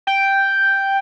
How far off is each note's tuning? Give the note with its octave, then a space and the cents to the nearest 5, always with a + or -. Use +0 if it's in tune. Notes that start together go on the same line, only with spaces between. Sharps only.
G5 +0